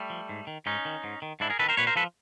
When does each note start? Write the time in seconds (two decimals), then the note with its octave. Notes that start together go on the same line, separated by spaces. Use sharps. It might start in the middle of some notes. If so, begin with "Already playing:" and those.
Already playing: G3 A3
0.10 F3
0.29 G#2
0.47 D#3
0.66 G#2 C#4 D#4
0.85 D#3
1.04 G#2
1.22 D#3
1.40 G#2 D4 E4
1.50 G#4 A#4
1.59 D#3 A4 B4
1.69 A#4 C5
1.77 A#2 B4 C#5
1.87 A#4 C5
1.96 F3 A4 B4